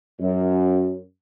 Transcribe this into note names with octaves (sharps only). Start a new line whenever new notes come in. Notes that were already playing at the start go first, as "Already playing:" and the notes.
F#2